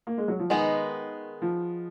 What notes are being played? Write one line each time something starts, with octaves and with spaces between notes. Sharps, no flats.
A#3
G#3
F#3
F3
D#3 G#3 B3 D#4
F3